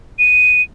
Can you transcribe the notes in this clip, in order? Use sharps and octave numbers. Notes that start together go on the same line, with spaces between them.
D#7